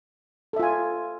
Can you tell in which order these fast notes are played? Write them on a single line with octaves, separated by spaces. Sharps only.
A4 E5 F4 G#5